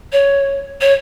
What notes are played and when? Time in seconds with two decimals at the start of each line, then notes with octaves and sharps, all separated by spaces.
0.12 C#5
0.81 C#5